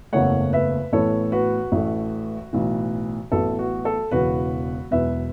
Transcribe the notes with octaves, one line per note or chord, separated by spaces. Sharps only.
F#1 E2 C#3 A3 C#5 F#5
B4 E5
A1 A2 E3 B3 A4 C#5
F#4 B4
A1 A2 A3
B1 A2 E3
A1 A2 F#3 B3 A4
F#4
A4
E1 E2 C#3 E3 F#4 B4
E1 E2 B2 F#3 B4 E5